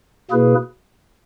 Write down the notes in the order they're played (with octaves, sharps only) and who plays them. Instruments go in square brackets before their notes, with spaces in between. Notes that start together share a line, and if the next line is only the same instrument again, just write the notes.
[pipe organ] B2 A#3 E4 G#4 B4